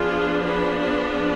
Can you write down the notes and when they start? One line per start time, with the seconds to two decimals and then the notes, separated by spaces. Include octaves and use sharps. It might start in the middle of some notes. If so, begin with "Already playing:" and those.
Already playing: F3 B3 D4 F4 G#4
0.43 G#4 B4
0.81 G#4 B4